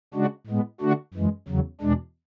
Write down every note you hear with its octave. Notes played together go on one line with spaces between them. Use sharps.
C#3 G#3 D4 F#4
A2 G#3 B3
D3 A3 D4 F#4
F#2 E3 G#3
E2 C#3 F#3
E2 B2 G#3 D4